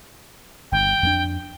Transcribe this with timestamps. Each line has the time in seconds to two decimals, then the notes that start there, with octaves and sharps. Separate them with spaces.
0.72 G1 G5
1.02 F2 A#3 D4